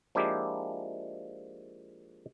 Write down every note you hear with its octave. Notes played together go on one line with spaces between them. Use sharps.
F3 G#3 A#3 D4 E4 G4